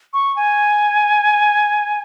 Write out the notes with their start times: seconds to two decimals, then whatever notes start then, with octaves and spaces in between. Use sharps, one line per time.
0.13 C#6
0.36 G#5